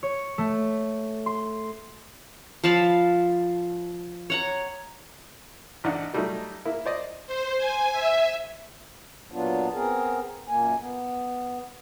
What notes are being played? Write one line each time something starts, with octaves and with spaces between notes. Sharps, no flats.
C#5
A3
C6
F3 F5 A5 B5
C#5 F#5 A#5
A1 D4 D#4 F#5
F#3 G3 A3 D#4
A#3 E4
C5 D5 D#5
C5
G#5
E5
A#2 F#3 B3 D4 F4
B3 C4 G#4 A#4
F#2 A#2 A#3 G#5
B3